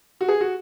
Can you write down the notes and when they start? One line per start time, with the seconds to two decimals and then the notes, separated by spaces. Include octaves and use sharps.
0.21 F#4
0.28 G#4
0.41 F#4